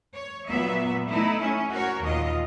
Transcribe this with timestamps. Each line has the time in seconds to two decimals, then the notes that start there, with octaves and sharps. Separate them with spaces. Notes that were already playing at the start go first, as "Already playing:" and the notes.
0.15 C#5
0.49 A#2 F#3 B3 E5
1.09 A3 D#4 E4
1.40 C#4
1.71 F#4 A#4 C#5
2.02 D#2 A#2 F4 D#5